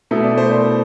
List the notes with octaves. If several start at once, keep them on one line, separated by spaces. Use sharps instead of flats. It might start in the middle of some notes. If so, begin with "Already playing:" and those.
B2 A3 E4
D5
C5
C5